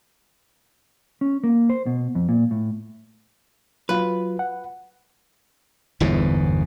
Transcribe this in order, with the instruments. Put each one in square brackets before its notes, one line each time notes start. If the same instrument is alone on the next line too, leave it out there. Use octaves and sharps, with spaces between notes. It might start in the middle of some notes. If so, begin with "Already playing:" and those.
[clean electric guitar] C#4
A#3
C5
B2
F2
A#2
A2
[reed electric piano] F#3 F4 [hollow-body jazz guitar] B4
[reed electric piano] F#5
[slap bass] G1 E2 G#2 B2